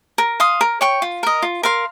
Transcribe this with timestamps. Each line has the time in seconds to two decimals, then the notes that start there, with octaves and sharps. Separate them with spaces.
0.18 A#4
0.40 F5 C6 D#6
0.61 A#4
0.81 C#5 G5 C#6
1.02 F4
1.23 A#4 D#5
1.42 F4
1.63 A#4 F5 C6